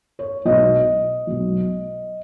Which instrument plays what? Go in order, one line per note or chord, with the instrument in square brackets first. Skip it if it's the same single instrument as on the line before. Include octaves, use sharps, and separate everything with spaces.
[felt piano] C#5
B1 B2 F#3 D#5
B1 B2 F#3